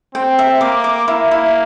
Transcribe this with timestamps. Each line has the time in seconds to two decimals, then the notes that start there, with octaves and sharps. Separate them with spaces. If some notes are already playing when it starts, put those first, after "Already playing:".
0.15 C4 G5
0.39 E5
0.61 A#3 D6
0.84 D6
1.08 A#3 E4
1.31 E4